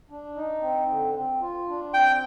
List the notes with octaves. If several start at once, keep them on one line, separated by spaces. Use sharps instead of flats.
D4
D#4
C4
D3
C4
F4
D4
C4 G5